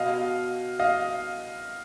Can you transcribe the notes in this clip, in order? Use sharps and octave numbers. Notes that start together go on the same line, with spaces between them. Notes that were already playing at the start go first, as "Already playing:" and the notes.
Already playing: B2 D#5 F5
D#5 F5